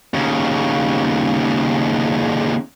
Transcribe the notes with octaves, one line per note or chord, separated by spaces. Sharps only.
D#2 C#3